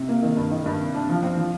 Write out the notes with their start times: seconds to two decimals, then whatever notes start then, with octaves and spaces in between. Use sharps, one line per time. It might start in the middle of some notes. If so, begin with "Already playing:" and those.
Already playing: C3
0.09 A#3
0.23 D#3
0.37 G2
0.51 D#3
0.66 G2
0.80 C3
0.95 D4
1.09 F3
1.23 C4
1.37 F3